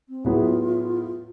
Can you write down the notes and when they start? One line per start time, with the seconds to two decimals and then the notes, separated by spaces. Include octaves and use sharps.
0.09 C4
0.24 A2 F#3 B3 E4 F4 G#4